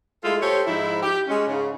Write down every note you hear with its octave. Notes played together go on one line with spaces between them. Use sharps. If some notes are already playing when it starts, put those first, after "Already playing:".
G#3 A3 E4 F4 A4
G4 A4 C5 C#5
G#2 F3 D#4 E4
G4
G#3 C#4
G#2 C#3